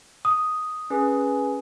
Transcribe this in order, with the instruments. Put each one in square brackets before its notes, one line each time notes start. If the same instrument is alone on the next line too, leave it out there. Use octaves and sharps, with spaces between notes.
[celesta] D#6
[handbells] C#4 G#4 B4